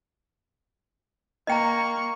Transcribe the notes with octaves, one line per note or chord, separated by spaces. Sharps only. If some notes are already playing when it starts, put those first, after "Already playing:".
A#3 D#5 G5 A#5 C#6